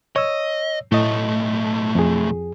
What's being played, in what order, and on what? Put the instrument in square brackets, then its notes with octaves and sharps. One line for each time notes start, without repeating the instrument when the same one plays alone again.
[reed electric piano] C#5 E6 [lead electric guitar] D#5
[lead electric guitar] B1 A3 [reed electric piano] A2 D#5
[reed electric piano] F2 G#4